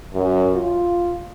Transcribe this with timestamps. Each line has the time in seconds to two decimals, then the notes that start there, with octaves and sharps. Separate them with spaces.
0.14 F#2
0.54 F4